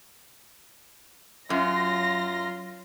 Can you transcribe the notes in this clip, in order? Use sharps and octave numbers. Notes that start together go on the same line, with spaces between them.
F#2 F#3 F4 A#6